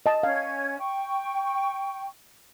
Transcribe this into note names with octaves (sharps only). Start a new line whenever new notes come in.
D#5 A5
C#4 F5 G#6
G5 C#6